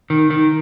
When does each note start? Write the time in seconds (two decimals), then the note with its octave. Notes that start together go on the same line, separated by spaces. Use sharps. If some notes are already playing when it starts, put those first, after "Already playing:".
0.10 D#3
0.30 D#3